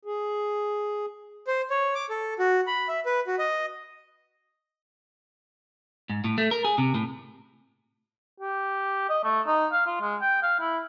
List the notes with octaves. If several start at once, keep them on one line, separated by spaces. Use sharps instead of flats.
G#4
C5
C#5
D6
A4
F#4
B5
E5
B4
F#4
D#5
G#2
A2
A3
A#4
G#4
C3
A2
G4
D#5
A3
D#4
F5
F4
G#3
G5
F5
E4